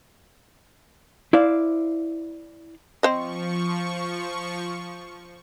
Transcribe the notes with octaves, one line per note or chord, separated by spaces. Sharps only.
E4 C5 D5 F5
F3 C4 C5 D#5 C#6